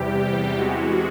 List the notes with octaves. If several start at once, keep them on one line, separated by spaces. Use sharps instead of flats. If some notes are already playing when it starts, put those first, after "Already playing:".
Already playing: E2 C3 E3 G3 G4
G4
E2 C3 E3 G#3 F#4